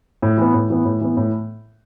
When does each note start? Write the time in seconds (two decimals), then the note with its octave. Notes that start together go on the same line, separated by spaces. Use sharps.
0.22 A2
0.38 E3 B3
0.54 A2
0.70 E3 B3
0.85 A2
1.01 E3 B3
1.17 A2